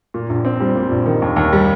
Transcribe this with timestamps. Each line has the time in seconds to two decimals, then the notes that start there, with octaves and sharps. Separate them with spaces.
0.14 A#2
0.29 A#1
0.45 C4
0.60 G3
0.75 A#2
0.91 A#1
1.06 D#3
1.22 D#2
1.36 D#2
1.53 G3